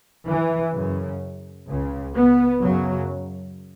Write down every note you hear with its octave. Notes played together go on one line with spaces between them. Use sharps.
E3
F#2 C#3
C#2 C#3
B3
F#2 C#3 F#3